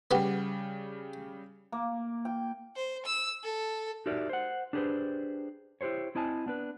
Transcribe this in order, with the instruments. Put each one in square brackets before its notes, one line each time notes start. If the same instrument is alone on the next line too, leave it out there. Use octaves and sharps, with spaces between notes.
[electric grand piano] C#3 G3 [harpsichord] B3 F#4 G4
[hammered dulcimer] A#3
G5
[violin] C5
E6
A4
[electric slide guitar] D#4 F#4 G4 A#4 D5 E5
C5 F#5
D4 G4 G#4 B4 C5
E4 G4 G#4 C5 C#5
C4 E4 D#5 G#5 A5
B3 D4 B4